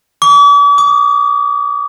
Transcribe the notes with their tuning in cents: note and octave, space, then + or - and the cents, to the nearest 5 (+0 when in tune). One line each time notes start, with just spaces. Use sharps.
D6 -45
D6 +45